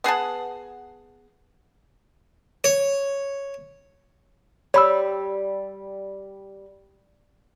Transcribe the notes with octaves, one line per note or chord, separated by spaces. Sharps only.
B3 G#4 F#5 A5
C#5
G3 C#5 B5 E6